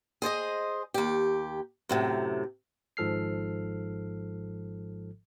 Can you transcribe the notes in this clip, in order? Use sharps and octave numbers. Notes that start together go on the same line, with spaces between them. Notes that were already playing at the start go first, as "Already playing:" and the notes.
G#4 C5 D5 D#5
D#2 G4
F#2 A2 C3
G#1 G#2 F3 A4 F6 C7